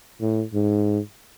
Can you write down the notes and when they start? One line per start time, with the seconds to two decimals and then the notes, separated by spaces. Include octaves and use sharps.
0.21 A2
0.54 G#2